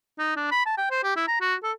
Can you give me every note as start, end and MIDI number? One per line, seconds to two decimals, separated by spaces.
0.19 0.36 63
0.36 0.47 62
0.52 0.65 83
0.66 0.77 81
0.77 0.90 79
0.91 1.02 72
1.03 1.13 67
1.16 1.26 64
1.28 1.41 82
1.41 1.55 66
1.63 1.72 69